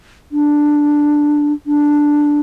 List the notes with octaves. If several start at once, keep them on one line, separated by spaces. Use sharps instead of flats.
D4
D4